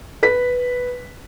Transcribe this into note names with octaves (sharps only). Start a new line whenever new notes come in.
B4 B6